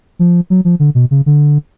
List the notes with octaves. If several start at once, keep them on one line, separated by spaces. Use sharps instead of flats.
F3
F#3
F3
D3
B2
C#3
D3